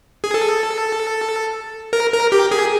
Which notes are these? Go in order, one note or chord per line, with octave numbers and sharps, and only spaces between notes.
G#4
A4
A#4
A#4
G4
G#4